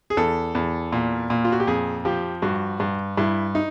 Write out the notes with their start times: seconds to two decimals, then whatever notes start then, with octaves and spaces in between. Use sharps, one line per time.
0.10 G#4
0.17 E2 A4
0.55 E2
0.92 A#2
1.30 A#2
1.45 F4
1.52 F#4
1.60 G4
1.67 F2 G#4
2.05 F3 G4
2.42 G2 F#4
2.80 G2
3.18 G2 E4
3.55 D#4